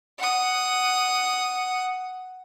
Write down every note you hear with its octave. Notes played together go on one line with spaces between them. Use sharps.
F#5 D#6